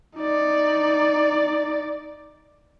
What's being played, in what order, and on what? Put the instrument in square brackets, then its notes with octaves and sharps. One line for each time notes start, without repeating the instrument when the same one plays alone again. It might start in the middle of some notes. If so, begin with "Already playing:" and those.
[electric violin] D#4 D5